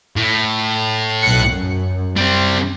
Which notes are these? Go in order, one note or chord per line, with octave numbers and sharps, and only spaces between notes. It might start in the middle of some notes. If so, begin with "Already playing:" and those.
A2
B1 F#6 C#7
F#2
G3 C4